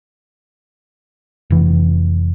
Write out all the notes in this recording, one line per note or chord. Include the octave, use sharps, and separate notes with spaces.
F1 E3